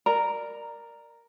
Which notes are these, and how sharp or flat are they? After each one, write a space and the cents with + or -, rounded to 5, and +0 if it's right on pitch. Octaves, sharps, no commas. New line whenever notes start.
A#4 +0 D5 +15 A#5 +0